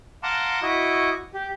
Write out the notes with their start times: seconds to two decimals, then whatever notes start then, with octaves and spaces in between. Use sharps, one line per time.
0.23 F5 F#5 A5 A#5 C6 D6
0.62 E4 F#4 D#5 C#6 D6
1.34 G4